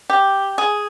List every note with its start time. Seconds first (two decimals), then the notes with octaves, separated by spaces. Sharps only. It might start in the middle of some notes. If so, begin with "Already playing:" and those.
0.10 G4
0.58 G#4